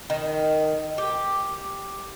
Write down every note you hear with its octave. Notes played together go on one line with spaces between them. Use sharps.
D#3
G4